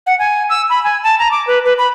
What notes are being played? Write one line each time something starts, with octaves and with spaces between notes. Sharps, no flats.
F#5
G#5
E6
B5
G#5
A5
A#5
D6
B4
B4
B5